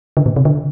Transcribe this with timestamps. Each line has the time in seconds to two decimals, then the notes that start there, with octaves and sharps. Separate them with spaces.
0.17 D3
0.26 A#2
0.36 C3
0.45 D3